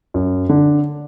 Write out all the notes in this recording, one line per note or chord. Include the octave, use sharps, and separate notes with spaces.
F#2
D3